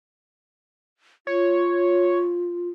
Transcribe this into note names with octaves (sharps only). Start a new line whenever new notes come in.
F4 C#5